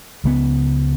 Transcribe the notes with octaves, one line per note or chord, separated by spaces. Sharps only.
C#2 C#3 G#3 B3